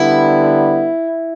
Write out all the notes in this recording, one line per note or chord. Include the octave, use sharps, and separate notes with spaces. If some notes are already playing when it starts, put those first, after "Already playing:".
Already playing: D3 G3 B3 E4